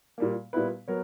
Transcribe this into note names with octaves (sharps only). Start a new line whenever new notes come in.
A#2 G3 A#3
A#2 G3 B3 E4 B4
F#3 B3 A#4 C#5